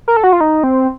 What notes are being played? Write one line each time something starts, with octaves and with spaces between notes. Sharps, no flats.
A#4
A4
F#4
F4
D#4
C4